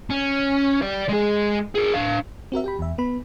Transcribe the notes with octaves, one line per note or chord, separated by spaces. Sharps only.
C#4
D5 G5
G#3 G#4
G#4 A#4
D4 F5
C4 F#4 A#4 E5
G4 G5 B5
E2 E5
B3 B4 B5